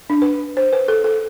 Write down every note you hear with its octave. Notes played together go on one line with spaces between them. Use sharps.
D4
B4
C5
B4
A4
A4